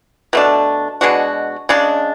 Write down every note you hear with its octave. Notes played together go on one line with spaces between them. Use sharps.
B2 A3 D4
B2 G#3 D4 F#4
C#3 G#3 D4